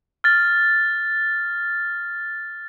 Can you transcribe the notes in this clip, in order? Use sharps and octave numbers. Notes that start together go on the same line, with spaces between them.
F6 A6